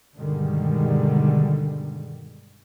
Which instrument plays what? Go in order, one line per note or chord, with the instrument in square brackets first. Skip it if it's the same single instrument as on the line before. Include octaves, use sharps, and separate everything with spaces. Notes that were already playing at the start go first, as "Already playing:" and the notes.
[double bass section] G2 B2 D3 D#3 G3 G#3